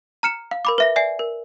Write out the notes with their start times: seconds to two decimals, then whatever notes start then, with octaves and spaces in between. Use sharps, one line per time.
0.23 A#5 F6 C#7 E7
0.51 F5
0.65 A#4 B5 D6
0.78 B4 E5 A#6
0.96 D5 E5 G#5 C7
1.19 A#4